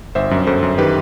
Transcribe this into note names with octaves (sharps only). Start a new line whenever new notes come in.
G1 C5 E5
F#2
F#2 A4 C5
F#2
D#3 G4 B4